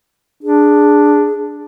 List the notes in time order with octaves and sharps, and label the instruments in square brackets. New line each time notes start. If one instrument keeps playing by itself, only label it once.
[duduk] D4 [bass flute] G#4